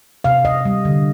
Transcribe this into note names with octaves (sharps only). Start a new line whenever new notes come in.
C3 F5
C3 D#5
G3
D3